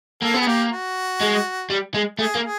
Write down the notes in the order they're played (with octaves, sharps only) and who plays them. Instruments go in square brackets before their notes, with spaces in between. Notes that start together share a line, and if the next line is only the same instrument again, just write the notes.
[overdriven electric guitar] A#3 [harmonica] A4
[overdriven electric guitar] B3
[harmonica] G#4
[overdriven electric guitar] A#3 [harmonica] G4
[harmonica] F#4
[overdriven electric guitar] G#3
G3
G#3
[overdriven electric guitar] A3 [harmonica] G#4
[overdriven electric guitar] A#3
[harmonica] G#4